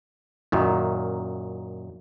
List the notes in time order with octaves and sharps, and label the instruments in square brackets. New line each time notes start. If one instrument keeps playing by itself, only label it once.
[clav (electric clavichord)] F#2 A#2 D#3 [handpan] E4 F#4